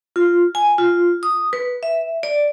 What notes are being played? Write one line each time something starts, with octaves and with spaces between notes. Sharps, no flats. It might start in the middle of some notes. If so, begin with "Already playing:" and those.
F4
G#5
F4
D#6
B4
E5
D5